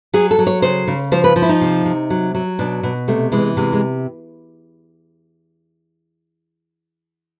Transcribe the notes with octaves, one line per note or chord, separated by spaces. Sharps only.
F#3 G#4
A4
F#3
C#5
C#3 C5
C#3
F3 C5
B4
F3
E4
D#4
C3
C3
F#3
F#3
B2 D4
B2
C3 A3
E3 G#3
C3 G#3
G#3